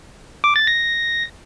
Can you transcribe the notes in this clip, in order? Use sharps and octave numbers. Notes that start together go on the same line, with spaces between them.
D6
A6
A#6